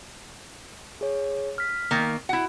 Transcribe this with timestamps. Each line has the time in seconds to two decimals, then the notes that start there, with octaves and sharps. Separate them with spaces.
1.01 G#4 C#5
1.58 F6 B6
1.91 D#3 A#3
2.29 E4 F#4 F#5